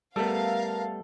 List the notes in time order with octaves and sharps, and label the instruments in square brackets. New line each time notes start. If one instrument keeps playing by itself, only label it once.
[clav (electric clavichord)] G3 A3 B3 [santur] A4 [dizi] A#4 [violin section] F5